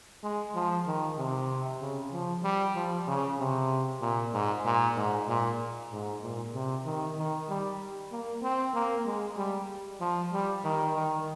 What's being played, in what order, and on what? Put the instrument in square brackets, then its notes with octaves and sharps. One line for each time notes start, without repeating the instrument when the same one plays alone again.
[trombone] G#3
F3
D#3
C3
C#3
F3
G3
F3
C#3
C3
A#2
G#2
A#2
G#2
A#2
G#2
A#2
C3
D#3
D#3
G3
A#3
C4
A#3
G#3
G3
F3
G3
D#3
D#3